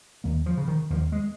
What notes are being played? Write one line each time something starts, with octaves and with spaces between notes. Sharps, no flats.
D#2 A#3
F3
C#3
D#3
D#2 F3
G#3